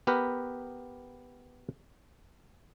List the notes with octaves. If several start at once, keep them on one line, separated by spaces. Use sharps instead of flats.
B3 G4 A#4 B4